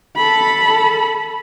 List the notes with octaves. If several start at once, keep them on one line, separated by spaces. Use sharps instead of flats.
A4 B5